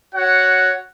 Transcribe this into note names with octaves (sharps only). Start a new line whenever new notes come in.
F#4 C#5 F#5